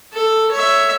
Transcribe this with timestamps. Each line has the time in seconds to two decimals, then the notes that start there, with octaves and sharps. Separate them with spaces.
0.13 A4
0.52 C#5 E5